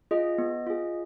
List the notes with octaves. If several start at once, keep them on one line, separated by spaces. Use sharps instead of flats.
F4 G#4 D#5
B3
F4 G#4